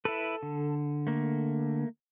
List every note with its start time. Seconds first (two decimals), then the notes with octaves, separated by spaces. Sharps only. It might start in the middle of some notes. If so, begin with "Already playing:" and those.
0.05 E4 A4 B4
0.43 D3
1.07 A3 A#3